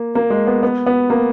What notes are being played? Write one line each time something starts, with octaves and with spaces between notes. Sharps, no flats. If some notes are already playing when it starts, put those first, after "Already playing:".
Already playing: A#3
A#3
G#3
B3
B3
B3
A#3